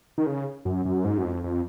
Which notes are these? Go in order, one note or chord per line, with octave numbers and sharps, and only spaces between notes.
D#3
C#3
F#2
F#2
G#2
F#2
F2
F2